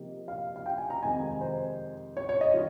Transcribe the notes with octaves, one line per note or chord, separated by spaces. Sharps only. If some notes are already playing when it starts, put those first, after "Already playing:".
Already playing: C3 F3 A#3 D#4 G4
F5
F5
G5
G#5
A#5
F2 C3 D#3 G#3 D#4 G#5
C5
C#5
C#5
D#5
D#3 G3 F4